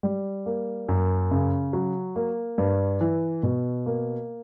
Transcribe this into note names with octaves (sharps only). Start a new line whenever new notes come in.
G3
A#3
F#2
C#3
F#3
A#3
G2
E3
B2
A#3